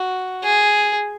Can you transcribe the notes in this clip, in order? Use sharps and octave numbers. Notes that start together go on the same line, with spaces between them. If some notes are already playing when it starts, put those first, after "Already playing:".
Already playing: F#4
G#4